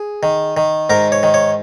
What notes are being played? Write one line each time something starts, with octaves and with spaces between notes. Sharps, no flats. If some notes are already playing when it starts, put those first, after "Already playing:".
Already playing: G#4
D#3
D#3
G#2 A#4
C#5
D#3
C#5